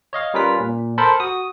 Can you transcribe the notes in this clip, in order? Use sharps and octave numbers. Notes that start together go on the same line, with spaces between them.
C#5 D#5 F5
G3 C#4 F4 A#4 B4 B6
A#2
A4 A#4 C5 B5
F#4 D#6